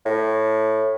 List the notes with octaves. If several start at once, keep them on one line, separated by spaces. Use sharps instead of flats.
A2